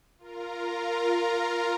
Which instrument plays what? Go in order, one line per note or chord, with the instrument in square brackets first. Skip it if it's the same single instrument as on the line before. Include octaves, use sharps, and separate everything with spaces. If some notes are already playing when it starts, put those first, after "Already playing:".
[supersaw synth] F4 A#4 A#5